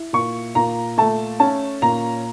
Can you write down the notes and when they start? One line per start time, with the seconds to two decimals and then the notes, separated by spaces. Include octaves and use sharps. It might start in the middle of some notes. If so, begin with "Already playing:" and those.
Already playing: E4
0.13 A#2 C#6
0.55 A#2 A#5
0.98 A3 A5
1.40 C#4 A5
1.82 A#2 A#5